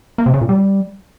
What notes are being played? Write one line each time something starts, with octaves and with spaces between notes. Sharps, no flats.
A#3
C3
C#3
A#2
G3